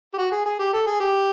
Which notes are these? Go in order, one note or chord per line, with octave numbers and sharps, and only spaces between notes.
G4
F#4
G#4
G#4
G4
A4
G#4
G4